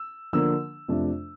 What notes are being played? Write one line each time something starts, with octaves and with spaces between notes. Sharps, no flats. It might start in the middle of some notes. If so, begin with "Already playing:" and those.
Already playing: E6
D3 F3 A#3 D4 E6
F2 C3 F3 A3 D4